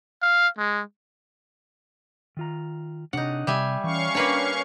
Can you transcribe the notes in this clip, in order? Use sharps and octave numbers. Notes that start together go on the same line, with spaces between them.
F5
G#3
D#3 F4 A#5
C3 D4 D#4 C#5 F#5
C3 G3 E5 G#5
E3 C#4 F5 C#6
A#3 D4 B4 C#5 G5 A#5